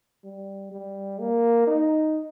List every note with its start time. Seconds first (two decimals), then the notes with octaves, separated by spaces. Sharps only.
0.24 G3
0.72 G3
1.19 A#3
1.67 D#4